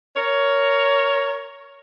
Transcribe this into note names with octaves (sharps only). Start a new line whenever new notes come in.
A#4 C#5